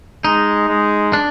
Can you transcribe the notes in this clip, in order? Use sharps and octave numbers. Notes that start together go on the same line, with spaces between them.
G#3 D#4
G#3
D4